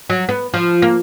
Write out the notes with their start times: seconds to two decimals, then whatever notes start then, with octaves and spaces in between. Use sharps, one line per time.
0.10 F#3
0.29 B3
0.54 F3
0.82 A#3